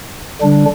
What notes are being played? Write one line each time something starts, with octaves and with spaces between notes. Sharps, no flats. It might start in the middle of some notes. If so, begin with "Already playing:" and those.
D3 G3 D4